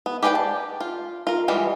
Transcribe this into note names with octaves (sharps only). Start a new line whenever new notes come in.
B3
G4 G#4 B4 D5 G5
A5
F4
F4 A#4
E3 G3 G#3 F4